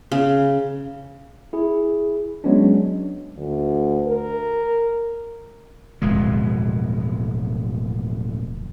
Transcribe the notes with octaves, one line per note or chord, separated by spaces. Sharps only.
C#3
E4 G#4
F#3 G#3 B3 C#4 D4
D2
A#4
D1 F2 B2 G#3